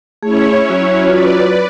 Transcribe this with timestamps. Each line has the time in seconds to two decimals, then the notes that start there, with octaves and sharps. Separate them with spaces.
0.22 A3 C#4 E4 G#4 C#5
0.70 F#3 F#4
1.06 F4 B4 D5